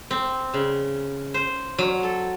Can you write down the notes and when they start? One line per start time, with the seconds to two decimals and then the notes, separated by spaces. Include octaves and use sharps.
0.11 C4
0.54 C#3
1.34 C5
1.78 F#3
2.03 A4